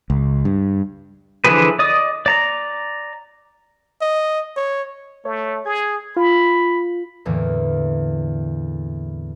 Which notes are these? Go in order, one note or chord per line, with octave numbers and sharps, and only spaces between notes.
C#2
G2
D3 E3 F3 G#4 B4
D5 D#5 D#6
D5 A#5
D#5
C#5
A3 C#5
G#4 G#6
F4 B5
E2 A2 D3 E3 A#3